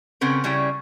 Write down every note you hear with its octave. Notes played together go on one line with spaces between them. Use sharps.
C#3 B3 C4 A#4
C#3 G3 C#4 E4 G5